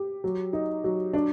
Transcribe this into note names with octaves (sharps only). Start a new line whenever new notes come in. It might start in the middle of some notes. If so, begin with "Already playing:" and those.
Already playing: G4
F#3
D#4
F#3
D4